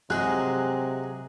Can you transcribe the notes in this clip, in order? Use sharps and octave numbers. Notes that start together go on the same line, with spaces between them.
C3 F#3 G#3 G#4 F#6